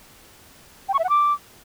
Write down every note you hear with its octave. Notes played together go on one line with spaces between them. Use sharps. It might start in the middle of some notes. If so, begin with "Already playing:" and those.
G5
C#6
E5
F#5
D6